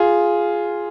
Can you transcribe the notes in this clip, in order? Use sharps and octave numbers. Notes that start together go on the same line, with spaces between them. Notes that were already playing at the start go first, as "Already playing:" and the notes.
Already playing: F4 G#4